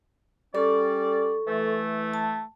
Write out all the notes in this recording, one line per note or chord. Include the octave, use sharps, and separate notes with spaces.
G3 C#4 A4 D5 C#6
E3 A3
A5